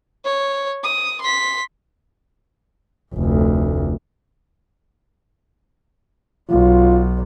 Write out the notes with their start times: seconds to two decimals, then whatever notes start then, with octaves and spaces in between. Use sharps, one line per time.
0.25 C#5
0.83 D#6
1.20 C6 B6
3.14 F1 D2
6.50 B1 F4